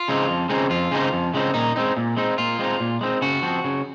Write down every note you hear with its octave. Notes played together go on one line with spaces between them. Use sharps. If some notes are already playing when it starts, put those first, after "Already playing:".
Already playing: F4
C#3 G#3 C4 D#4
F2
C#3 G#3 C4 D#4
F2 F4
C#3 G#3 C4 D#4
F2
C#3 G#3 C4 D#4
A#2 D#4
G#3 C4 D#4
A#2
G#3 C4 D#4
A#2 F4
G#3 C4 D#4
A#2
G#3 C4 D#4
C#3 F#4
F3 C4
C#3